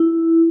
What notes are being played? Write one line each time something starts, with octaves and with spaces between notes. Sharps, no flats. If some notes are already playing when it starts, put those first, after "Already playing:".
Already playing: E4